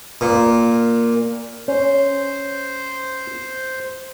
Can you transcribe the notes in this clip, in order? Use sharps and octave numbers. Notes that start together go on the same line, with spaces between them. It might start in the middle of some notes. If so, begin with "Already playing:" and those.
A#2
C#4 C5